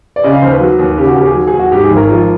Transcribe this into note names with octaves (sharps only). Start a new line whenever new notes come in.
D5
C#3 D#5
F5
D#2 C5
B4
F#3
D#2
C#3 G4
F#4
D#2 G4
G#4
F#3
G#4
D#2
F#4
G#2 G4
G#4
G#1
A#4
F3